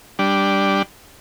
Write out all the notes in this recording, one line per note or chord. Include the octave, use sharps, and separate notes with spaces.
G3 D4